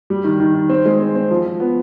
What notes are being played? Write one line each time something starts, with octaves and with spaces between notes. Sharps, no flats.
G3
D#3
D#3
D#3
C4
G#3
C4
C4
F3
F3
B3